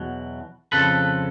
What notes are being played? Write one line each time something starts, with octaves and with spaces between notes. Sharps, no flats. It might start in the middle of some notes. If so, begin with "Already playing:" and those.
Already playing: E2 B2 F#3
F2 C#3 F3 A4 B4